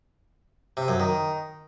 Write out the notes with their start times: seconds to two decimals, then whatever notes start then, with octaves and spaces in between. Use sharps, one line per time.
0.77 C3
0.88 F#2
1.00 D#3